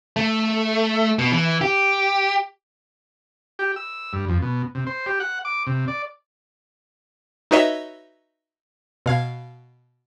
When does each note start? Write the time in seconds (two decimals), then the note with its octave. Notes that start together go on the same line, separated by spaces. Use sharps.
0.16 A3
1.19 B2
1.32 E3
1.61 G4
3.59 G4
3.76 E6
4.13 G2
4.29 F2
4.42 B2
4.75 C3
4.87 C5
5.06 G4
5.20 F#5
5.45 D6
5.67 C3
5.88 D5
7.51 D#4 F#4 B4 C#5 D#5 E5
9.06 B2 F5 G#6